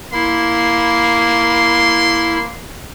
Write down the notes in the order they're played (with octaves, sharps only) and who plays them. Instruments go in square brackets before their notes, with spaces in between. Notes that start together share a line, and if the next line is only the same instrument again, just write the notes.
[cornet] A#3 [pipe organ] E4 [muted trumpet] C6